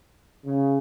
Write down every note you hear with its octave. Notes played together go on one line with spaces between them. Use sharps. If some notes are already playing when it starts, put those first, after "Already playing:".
C#3